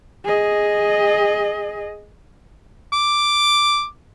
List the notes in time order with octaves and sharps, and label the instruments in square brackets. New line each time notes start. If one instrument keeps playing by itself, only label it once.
[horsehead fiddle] G#4 D#5
[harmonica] D6